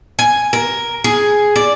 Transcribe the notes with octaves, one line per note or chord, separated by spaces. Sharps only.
G#5
A#4
G#4
D5